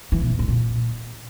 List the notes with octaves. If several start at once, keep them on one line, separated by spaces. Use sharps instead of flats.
E3
B2
E2
G#2
A#2